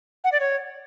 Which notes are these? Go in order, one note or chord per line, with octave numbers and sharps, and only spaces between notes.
F#5
D5
C#5